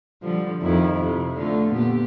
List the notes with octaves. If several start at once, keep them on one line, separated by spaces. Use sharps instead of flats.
D3 F3 G3
F2 D#3 E4
C3
D3 A3 F4
A#2 B3 G4